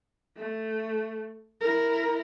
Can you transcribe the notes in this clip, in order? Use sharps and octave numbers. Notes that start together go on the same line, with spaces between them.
A3
E4 A#4